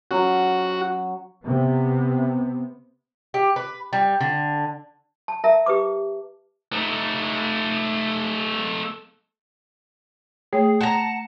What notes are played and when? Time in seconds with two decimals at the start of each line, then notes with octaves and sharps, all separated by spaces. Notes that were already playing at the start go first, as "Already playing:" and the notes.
0.11 F#3 C#4 F#4
1.45 C3 B3
3.34 G4
3.56 B4
3.93 G3
4.21 D3
5.28 A5
5.44 A#4 E5 A5 A#5
5.66 G4 B4 D6
6.73 A3 D#4
10.53 A3 G#4 C#5 G5
10.81 F#5 A5 A#5